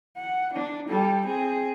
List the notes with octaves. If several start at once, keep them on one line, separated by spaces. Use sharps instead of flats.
F#5
D4
G3 A4
C4 G#4